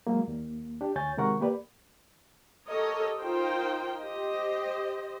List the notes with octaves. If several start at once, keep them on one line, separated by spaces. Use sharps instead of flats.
F#3 G#3 A#3
D#2 A#3
D4 G4
D2 C#5 G#5 G6 A6
C3 D#3 G#3 A#4 F#5 C#6
A#3 G4 B4 D5
G4 A4 A#4 C#5 D#5
D#4 F4 A#4 C5 G5
G4 C5 D#5